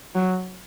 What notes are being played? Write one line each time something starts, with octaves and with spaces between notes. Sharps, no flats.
F#3